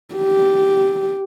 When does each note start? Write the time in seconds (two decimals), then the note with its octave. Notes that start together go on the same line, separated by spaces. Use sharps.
0.15 G4